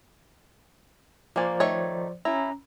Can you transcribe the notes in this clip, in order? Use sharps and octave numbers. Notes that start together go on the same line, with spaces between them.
F3 A#3 C5 D5 G#5
D#3 A3 C#5
C#4 E4 A#5